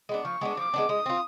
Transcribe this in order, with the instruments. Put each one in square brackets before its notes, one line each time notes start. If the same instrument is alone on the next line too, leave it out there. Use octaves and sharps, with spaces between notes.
[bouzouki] G#3 B3 D4
[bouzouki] F3 [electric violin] C#6
[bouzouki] G#3 B3 D4
[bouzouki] F3 [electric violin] D6
[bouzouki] G#3 B3 D4
[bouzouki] G#3 [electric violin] D#6
[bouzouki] C4 F4